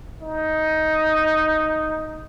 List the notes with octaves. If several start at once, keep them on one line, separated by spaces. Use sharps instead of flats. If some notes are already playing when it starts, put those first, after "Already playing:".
D#4